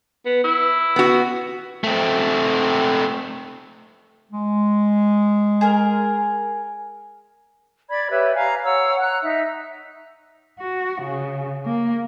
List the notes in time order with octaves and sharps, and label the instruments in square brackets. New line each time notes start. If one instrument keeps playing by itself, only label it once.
[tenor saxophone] B3
E4
[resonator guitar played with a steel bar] B3 F#4
[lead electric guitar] A3 C4
[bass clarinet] G#3
[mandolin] G#4 A#4
[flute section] D5 B5 G#6
G4 B4 C#5 E5
F5 G#5 A#5
C#5 F#5 A#5 E6
A#5 F#6
D#4 E5
[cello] F#4
C#3
A#3